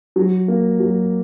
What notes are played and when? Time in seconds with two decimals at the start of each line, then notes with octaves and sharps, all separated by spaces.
0.16 F#3
0.48 A#3
0.80 F#3